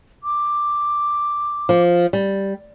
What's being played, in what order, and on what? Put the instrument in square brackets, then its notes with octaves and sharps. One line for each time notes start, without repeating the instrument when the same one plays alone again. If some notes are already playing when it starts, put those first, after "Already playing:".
[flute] D6
[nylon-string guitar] F3
G3